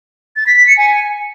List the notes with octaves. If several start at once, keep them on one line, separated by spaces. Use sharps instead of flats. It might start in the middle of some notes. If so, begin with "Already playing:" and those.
A6
B6
B6
C#7
G#5